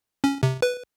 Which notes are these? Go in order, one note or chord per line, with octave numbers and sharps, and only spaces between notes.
C#4
C3
B4